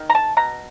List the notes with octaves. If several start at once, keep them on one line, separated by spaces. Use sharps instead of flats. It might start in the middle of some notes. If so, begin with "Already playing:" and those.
Already playing: D#3
A#5
A5
B2 A#5